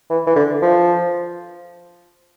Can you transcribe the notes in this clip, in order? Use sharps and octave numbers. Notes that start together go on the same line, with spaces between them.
E3
E3
D3
F3